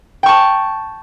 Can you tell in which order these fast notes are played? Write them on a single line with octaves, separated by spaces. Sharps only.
G5 C#6 A5